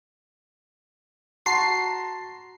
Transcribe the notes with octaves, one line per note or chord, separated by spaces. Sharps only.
F#4 A5 A#5 C6 C7